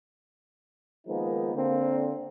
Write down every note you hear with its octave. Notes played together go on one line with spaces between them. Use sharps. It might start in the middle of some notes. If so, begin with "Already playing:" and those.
D#3 F3 G#3 A#3 B3 D#4
D3 A#3 C4